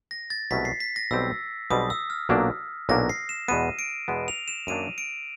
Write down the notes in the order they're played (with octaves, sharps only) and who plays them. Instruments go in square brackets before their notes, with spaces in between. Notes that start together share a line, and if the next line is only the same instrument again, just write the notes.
[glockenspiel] A#6
A6
[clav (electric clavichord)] C2 B2 F#3 A3 C#4 [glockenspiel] B6
[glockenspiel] C7
B6
A#6
[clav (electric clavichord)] B1 B2 G3 C4 [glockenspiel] E6
[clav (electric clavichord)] B1 B2 G3 C4 [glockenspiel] D#6
[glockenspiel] E6
F6
[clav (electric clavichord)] B1 A#2 F#3 A#3 D4
[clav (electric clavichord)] B1 A#2 F#3 A#3 D4 [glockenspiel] A#6
[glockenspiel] C7
E7
[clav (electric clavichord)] E2 B2 G#3 B3 [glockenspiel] D#7
[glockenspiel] D7
[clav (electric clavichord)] E2 B2 G#3 B3
[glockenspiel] F7
E7
[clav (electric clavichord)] F#2 D#3 F#3 A#3 D4 [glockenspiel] D#7
[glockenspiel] D7